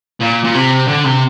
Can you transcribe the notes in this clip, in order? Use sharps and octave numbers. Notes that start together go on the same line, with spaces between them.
A#2
A#2
C3
D3
C3